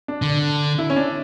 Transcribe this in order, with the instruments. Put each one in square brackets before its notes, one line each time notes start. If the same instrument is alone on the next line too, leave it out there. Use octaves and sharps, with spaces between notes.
[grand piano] D4
[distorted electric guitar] D3
[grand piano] E4
C#4
D4